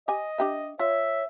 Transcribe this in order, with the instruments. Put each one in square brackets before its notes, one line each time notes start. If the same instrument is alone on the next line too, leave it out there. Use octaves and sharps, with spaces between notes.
[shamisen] G4 G#5 [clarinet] D#5
[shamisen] D4 G4 E5
[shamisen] F4 [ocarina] C#5 [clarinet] E5